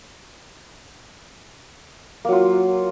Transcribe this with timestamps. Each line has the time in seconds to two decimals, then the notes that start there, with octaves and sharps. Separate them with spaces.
2.25 A#3
2.29 F#3
2.32 F4